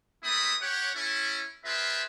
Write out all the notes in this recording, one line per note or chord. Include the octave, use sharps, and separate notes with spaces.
A3 A#3 C4 E4 B5 D#6
G4 C#5 F#5
C#4 E4 A4
C4 F4 G#4 B4 E5